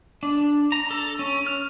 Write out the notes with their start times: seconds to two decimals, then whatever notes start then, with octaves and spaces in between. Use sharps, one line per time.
0.23 D4
0.72 A#5
0.91 A4
1.19 C#4
1.46 F6